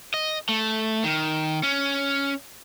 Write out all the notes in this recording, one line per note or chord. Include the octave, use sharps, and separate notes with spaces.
D#5
A3
D#3
C#4